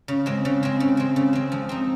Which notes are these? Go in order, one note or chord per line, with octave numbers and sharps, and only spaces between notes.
C#3
G#3 C4
C#3
G#3 C4
C#3
G#3 C4
C#3
G#3 C4
F3
C4 D#4